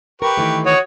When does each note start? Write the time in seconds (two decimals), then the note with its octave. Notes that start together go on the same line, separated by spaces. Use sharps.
0.22 G4 A#4 B4 C#6
0.37 D#3 E3 A3
0.66 F#4 C#5 D#6